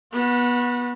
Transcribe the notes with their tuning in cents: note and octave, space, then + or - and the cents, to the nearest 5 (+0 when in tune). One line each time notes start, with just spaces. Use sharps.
B3 -20 F#4 -40